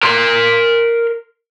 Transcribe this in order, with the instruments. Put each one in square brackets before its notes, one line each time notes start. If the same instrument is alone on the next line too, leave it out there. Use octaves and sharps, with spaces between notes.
[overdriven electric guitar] A#4 C6